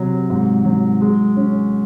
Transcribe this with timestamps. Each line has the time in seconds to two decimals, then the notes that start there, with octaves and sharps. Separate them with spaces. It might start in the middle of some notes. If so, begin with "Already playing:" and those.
Already playing: C3 F#3
0.30 G#2
0.65 F#3
1.01 G#3
1.36 C#4